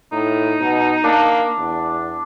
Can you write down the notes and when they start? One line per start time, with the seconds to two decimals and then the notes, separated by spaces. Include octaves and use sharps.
0.12 A2 D#4
0.60 B2
1.04 A#3 D4
1.58 E2